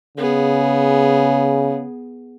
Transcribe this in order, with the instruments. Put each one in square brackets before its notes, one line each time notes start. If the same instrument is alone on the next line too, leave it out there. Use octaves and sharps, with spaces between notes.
[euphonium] C#3 [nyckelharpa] B3 G#4